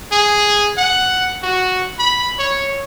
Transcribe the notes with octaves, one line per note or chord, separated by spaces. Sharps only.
G#4
F#5
F#4
B5
C#5